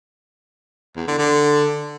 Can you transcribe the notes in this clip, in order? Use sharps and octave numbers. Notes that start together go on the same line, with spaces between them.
E2
D3
D3